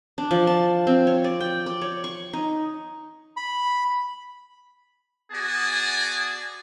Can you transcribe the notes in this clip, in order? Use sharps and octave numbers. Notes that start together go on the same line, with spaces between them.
D4
F3
A5
C4
C#5
D5
G5
D5
C#5
C#6
D#4
B5
B3 F#4 G#4 D5 G#5 A5